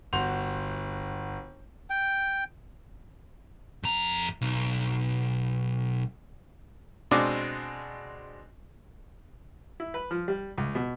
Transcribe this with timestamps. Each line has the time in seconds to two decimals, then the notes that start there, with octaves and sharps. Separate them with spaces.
0.13 G1 F#4 C6 G6 F7
1.90 G5
3.83 F2 A#5
4.41 B1
7.11 B2 G#3 C4 D4 D6
9.80 E4
9.94 B4
10.11 F3
10.28 G3
10.58 C#2
10.75 B2